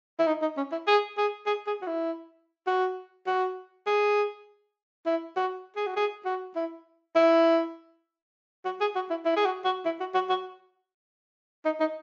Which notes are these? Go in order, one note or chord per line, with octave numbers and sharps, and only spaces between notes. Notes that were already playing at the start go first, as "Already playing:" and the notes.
E4
D#4
D#4
C#4
E4
G#4
G#4
G#4
G#4
F#4
E4
F#4
F#4
G#4
E4
F#4
G#4
F#4
G#4
F#4
E4
E4
F#4
G#4
F#4
E4
E4
G#4
F#4
F#4
E4
F#4
F#4
F#4
D#4
D#4